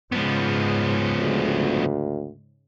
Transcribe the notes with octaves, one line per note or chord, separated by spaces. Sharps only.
G#2 C#3 F3 G#3 B3
D2